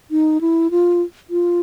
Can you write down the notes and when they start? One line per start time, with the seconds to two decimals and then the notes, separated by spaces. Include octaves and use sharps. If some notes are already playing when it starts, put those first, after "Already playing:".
0.11 D#4
0.41 E4
0.71 F4
1.30 F4